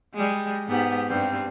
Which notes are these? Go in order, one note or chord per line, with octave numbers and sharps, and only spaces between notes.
G3 G#3
G#2 B3 G4
G2 G3 C4